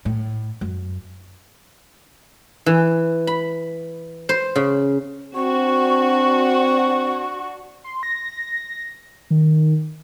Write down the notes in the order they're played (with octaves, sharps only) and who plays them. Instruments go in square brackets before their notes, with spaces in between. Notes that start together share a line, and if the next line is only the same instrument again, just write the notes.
[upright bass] A2
F#2
[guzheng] E3
B5
C5
C#3
[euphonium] C4 [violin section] D4 F#4 [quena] C#6
[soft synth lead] C6
A#6
D#3